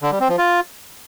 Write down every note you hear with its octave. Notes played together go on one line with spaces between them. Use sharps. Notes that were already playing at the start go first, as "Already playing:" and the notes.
D3
G3
C4
F3
F4